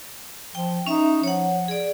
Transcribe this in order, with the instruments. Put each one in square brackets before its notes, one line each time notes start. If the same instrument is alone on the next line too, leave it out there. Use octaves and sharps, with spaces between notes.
[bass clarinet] F3 [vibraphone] G5
[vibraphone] C#4 E5 [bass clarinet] D#4
[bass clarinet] F3 [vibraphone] C#5 F#5
[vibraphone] G#4 D5